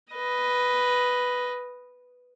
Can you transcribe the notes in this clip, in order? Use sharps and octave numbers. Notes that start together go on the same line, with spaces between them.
B4 D#5